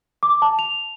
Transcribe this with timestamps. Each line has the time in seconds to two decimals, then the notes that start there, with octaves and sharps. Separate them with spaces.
0.23 D6
0.42 A5
0.59 F7